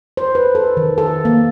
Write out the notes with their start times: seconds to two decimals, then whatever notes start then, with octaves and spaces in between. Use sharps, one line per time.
0.17 C5
0.35 B4
0.55 A4
0.77 D#3
0.98 A4
1.25 A#3